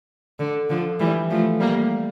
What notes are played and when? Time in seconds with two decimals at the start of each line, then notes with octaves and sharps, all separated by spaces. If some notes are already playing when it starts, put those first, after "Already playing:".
0.39 D3
0.69 D3 F3
1.00 E3 G3
1.30 F3 A3
1.60 G3 A#3